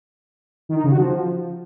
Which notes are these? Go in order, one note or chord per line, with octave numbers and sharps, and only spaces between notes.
D#3
D#4
C#3
F#4
F3